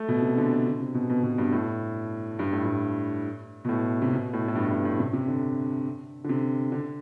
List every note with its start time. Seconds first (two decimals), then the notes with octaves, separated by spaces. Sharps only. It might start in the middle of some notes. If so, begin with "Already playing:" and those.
Already playing: A3
0.08 B2
0.22 C3
0.38 D3
0.52 D3
0.66 D3
0.80 C3
0.94 B2
1.10 B2
1.23 B2
1.38 G2
1.52 A2
2.39 G2
2.53 A2
2.65 G2
3.65 B2
3.69 A2
4.02 C3
4.13 B2
4.33 A2
4.48 A2
4.55 G2
4.67 A2
4.71 G2
4.85 A2
4.99 C3
5.13 C3
5.28 D3
6.24 D3
6.29 C3
6.72 D3